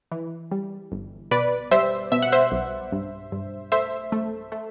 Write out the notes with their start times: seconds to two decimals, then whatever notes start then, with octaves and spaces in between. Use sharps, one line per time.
0.11 E3
0.52 G3
0.92 G1
1.31 B2 B4 D5
1.71 G3 C5 E5
2.12 B2 E5
2.22 F#5
2.32 C5 E5
2.52 B1
2.92 G2
3.32 G2
3.72 A3 C5 E5
4.12 A3
4.52 A3